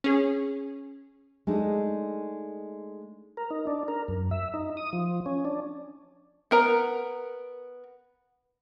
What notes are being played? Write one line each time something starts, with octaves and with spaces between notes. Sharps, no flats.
C#4 G#4
G#3 A3 D4 D#4
A#4
D#4
D4
A#4
F#2
E5
D#4
D#6
F3
C#4
D4
B3 A#4 A#5